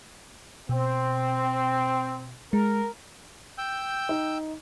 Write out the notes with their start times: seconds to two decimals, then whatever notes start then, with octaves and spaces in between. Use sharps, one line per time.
0.69 B2 C4
2.53 G#3 A#4
3.58 G5 E6 G6
4.09 D#4